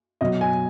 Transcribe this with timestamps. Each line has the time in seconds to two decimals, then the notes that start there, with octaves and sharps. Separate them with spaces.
0.21 B2 F#3 D#5
0.41 G#5